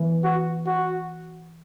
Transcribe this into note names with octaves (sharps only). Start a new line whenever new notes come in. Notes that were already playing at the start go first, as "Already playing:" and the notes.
Already playing: E3
F#4
F#4